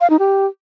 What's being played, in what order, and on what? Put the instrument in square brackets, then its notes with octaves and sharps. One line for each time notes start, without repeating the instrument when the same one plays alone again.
[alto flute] F5
D#4
G4